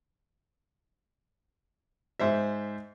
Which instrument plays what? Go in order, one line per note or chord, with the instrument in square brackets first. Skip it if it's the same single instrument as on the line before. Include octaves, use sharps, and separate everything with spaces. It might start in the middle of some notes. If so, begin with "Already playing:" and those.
[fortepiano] G#2 C5 E5